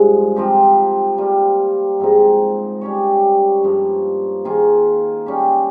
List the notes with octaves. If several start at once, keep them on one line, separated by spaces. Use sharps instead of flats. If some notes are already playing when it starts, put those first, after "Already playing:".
Already playing: G2 F3 G#3
F3 C4 D#4 G4
G3 A#3 F4
G#2 F3 C4 D#4
G3 C#4 G4 C#5
G2 F3 A#3
D#3 A#3 F4 G#4
G3 C#4 G4